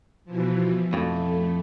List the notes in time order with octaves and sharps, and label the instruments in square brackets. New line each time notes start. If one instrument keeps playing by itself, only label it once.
[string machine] B2 E3 F3
[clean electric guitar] F2 A2 [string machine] A3